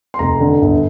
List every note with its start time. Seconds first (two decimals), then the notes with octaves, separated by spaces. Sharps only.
0.14 C6
0.19 F1 A#5
0.40 D3
0.62 G1